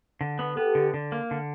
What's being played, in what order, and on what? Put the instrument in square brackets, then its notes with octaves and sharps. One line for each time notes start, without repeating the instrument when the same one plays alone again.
[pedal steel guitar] D3
B3
[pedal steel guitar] B3 [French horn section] G4 A4
[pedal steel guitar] D3
D3
A#3
D3